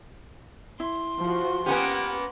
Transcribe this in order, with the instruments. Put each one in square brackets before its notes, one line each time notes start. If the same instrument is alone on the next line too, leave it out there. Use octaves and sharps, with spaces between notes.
[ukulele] E4 [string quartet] C6
[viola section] F3 F#4
[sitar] A#3 B3 C#4 [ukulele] G4 G#5 [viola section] F#5